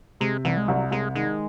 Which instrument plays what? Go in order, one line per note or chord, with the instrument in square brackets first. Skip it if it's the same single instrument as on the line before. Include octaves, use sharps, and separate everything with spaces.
[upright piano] C3 [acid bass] G#3
[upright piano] C2 [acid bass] E3
[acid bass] G#3
[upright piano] C2 [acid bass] F#3
[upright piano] C2 [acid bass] G#3
[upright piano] D#3 [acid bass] G#3